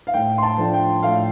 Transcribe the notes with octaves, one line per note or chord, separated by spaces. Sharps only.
F5
A2 G5
C6
A5
F3 A3 D4
G5
A2 F5